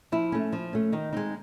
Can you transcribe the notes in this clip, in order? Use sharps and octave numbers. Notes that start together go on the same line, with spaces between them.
F3 E4
A3 C#4
F3
A3 C#4
D#3 D#4
G#3 C4 D#4